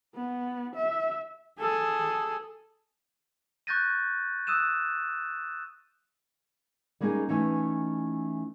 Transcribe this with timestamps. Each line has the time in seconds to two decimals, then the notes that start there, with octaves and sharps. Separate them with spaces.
0.15 B3
0.76 E5
1.60 G#4 A4
3.67 C#6 F#6 G6 A6 A#6 D#7
4.47 D#6 E6 F#6 D#7 E7
7.00 G3 G#3 A#3 C#4 D#4 G#4
7.29 E3 A3 C#4 D#4